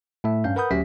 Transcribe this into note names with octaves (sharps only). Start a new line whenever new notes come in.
A2 A3 E5
G2 C#4 F5 G6
A#4 B4 F#5 B5 D#6 G6
D2 F#3 C#4 G4 E5 B6